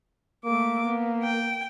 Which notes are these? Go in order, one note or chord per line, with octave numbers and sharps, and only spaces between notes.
A3 A#3 D6
B3
G5